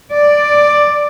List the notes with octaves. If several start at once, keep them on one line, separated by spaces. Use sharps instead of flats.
D5